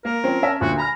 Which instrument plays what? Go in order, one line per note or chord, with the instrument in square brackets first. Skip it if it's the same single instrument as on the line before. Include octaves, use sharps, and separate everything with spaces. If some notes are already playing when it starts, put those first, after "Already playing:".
[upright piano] A#3 [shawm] A#4
[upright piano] F3 C4 C#4
C#4 E5 A5
[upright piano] D2 A#2 [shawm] F#4
[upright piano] G#5 B5 F6 [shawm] A#5